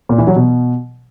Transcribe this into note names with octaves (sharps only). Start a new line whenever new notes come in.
A#2
E3
F#3
B2